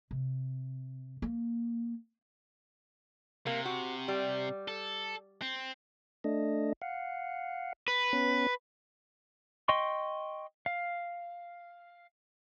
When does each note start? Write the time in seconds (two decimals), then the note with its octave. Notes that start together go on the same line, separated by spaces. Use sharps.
0.11 C3
1.22 A#3
3.47 C3 A#3
3.65 F#4
4.08 G3
4.68 A4
5.42 C4
6.24 A3 D4 D#5
6.82 F5 F#5
7.88 B4
8.13 B3 C#4
9.68 D#5 G5 C6 C#6
10.66 F5